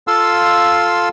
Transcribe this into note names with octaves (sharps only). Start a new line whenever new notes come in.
F4 A4 F5 C6 E6